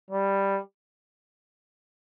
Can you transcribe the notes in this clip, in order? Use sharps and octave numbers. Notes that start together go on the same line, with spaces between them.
G3